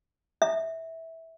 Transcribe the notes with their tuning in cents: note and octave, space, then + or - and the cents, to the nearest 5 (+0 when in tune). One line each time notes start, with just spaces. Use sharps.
E5 -15